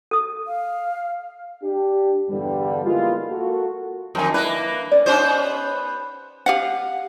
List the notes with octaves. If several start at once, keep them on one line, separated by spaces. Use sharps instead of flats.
A4 D#6
F5
D4 G4
E2 G2 D3 G3
F3 G#3 A#3 B3 E4 F4
A#3 F#4 A4
F2 D#3 A#4 G#5
A#3 D4 E4 B4 D5
C#4 B4 D5
B3 C#4 D#4 G4 C5
G4 F5 F#5